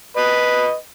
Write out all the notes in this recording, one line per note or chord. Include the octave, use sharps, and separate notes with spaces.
B4 D#5